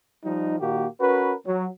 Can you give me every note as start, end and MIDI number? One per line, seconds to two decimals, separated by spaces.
0.24 0.60 53
0.24 0.60 55
0.24 0.60 63
0.60 0.86 46
0.60 0.86 51
0.60 0.86 58
0.60 0.86 66
0.60 0.86 67
1.00 1.34 61
1.00 1.34 66
1.00 1.34 70
1.00 1.34 71
1.46 1.66 54